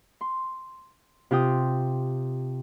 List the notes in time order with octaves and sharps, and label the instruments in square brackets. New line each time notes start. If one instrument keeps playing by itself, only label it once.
[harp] C6
C3 F4 G5 D#6